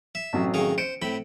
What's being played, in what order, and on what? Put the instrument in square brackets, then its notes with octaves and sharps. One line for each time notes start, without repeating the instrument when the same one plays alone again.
[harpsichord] E5
[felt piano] A1 C3 F#3
[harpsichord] D#3 G#4 F5
[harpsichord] C5 [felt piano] C#7 D7
[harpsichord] A2 C4 B5